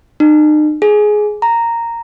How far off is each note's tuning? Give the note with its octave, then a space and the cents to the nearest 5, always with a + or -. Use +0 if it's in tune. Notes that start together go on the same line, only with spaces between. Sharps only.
D#4 -40
G#4 +15
A#5 -5